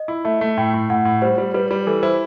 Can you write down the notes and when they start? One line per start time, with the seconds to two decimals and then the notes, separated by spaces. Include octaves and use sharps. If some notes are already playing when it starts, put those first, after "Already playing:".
Already playing: D#5
0.08 E4
0.25 A3 E5
0.41 A3
0.57 A2 G5
0.74 A2
0.90 A2 F#5
1.05 A2
1.22 G3 C5
1.38 G3
1.54 G3 B4
1.71 G3
1.87 E3 A4
2.02 E4 C5